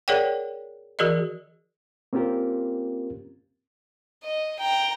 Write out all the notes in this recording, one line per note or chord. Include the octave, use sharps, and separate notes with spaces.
G#4 A#4 C#5 D5 F#5 G5
E3 F#4 G#4 A#4 D5 D#5
A#3 C4 C#4 F4 G4 A#4
D#5
G5 A#5